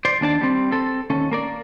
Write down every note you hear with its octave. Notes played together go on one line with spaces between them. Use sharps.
C5 D5
D#2 D4 D5 A5
G3 C4
C4 A4
D#2 C#4 A4
A#3 A#4 D5